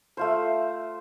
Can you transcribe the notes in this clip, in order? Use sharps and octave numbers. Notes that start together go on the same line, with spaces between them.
A3 F4 C5